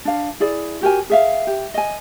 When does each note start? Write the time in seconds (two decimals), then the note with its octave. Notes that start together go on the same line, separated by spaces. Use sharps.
0.05 D4 F5
0.40 E4 G#4 D5
0.81 F#4 G4 A#4 G#5
1.10 G#4 E5 F5
1.47 G4
1.74 D#5 G#5